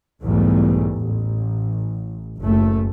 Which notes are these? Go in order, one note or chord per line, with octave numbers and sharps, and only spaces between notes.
B1 E2 G#2 G3 A3
A1
F#1 A3